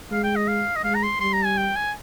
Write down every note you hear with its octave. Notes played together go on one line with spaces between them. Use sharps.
G#3 F5
G5
D#5
F5
D#5
G#3 F5
A#5
C6
G3 C6
A#5
G#5
G5
G#5